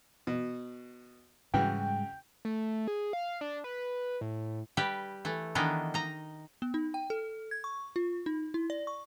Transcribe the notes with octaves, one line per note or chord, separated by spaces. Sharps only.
B2
G#2 C#3 E3 G3 G#3 F#4 G5
A3
G#4
F5
D4
B4
A2
G3 G4 B4
E3 A3
D#3 E3 B3 D4 D#4
D#4 A#5
B3
D#4
G5
A4
G#6
C#6
F4
D#4
E4
D5
C#6